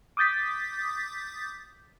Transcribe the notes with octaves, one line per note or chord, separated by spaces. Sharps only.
D6 D#6 G6 A6 B6